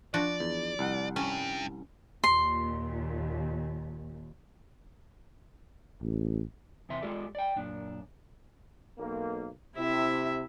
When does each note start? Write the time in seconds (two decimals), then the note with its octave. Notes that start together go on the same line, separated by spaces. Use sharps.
0.14 F3 D4 F#4 D5
0.40 E2
0.79 C2 F#5
1.16 G2 C#4
2.24 D#2 A#2 C6
6.02 A1
6.89 E2 C3 E3 E5 C6
7.02 G#3 F4 G4 A4 D5
7.35 D5 G5
7.57 F#2 A#2 D4
8.98 B1 A#3
9.76 C3 E4 E5